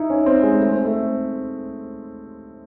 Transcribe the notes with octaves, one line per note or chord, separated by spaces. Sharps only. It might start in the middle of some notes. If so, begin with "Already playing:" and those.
Already playing: D#4 E4
C#4
C4
G#3
A3
C4
A3